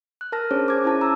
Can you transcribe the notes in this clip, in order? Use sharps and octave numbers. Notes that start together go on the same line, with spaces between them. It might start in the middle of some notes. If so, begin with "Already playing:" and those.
F#6
A#4 A5 F6 A#6
C#4 D4 G#4 C5 C#5
D6 G#6
C#4 E4 C#5 A5
A#5 E6